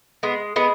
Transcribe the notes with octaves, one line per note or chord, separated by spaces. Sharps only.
G#3 B3
G#3 B3